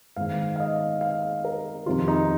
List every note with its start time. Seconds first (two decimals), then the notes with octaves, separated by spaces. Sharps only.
0.16 G#2 D#3 F5
0.56 F5
0.60 D#5
1.01 F5
1.45 A#4
1.86 F2 C3 D#3 F4
2.08 D#4